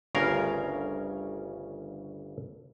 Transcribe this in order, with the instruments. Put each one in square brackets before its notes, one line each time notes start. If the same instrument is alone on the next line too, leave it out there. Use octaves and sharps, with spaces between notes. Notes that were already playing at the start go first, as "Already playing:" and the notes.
[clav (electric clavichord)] G1 D2 C#3 C#4 A#4 F5